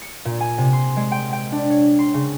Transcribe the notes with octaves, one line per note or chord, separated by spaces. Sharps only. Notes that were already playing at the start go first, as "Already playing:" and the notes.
C#7
A#2
G#5
C3
C6
G#3
G5
G5
D4
C#5
C6
C#3